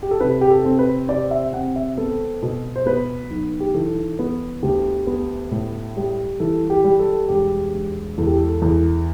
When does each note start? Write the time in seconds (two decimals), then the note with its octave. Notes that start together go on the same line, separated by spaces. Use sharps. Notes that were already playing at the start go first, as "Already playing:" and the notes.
0.03 G4
0.11 A4
0.20 C3 B4
0.41 G4
0.50 A4
0.65 C4
0.79 B4
1.08 C3 D5
1.31 E5
1.53 C4 F#5
1.76 E5
1.97 B3 A4
2.42 B2
2.76 C5
2.86 B3 B4
3.30 B1
3.60 G4
3.74 E3 A4
4.19 B3
4.63 D2 G4
5.07 B3
5.51 A2
5.96 G3
6.40 E3 A4
6.70 G4
6.84 G3
7.00 A4
7.29 E1 G4
7.74 E1
8.18 E2 A4
8.27 G4
8.37 A4
8.62 E2